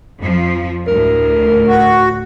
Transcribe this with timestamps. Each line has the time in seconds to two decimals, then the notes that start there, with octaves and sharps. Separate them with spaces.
0.19 F2 F3
0.87 D2 A2 A#4
1.68 F#4